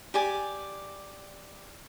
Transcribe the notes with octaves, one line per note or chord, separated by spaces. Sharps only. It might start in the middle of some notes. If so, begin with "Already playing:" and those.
G4 D5 G#5